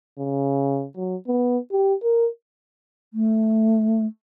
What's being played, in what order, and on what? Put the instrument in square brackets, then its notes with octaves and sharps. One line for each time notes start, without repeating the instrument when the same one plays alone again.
[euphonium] C#3
F#3
B3
G4
A#4
[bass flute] A3